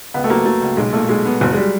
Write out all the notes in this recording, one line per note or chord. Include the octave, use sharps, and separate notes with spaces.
C#2 B3
A3
F#3 A#3
F#3 A3
C#2
B1 G#3
A#2 A3
B1 G#3
B3
F#1 F#3
G#3
G3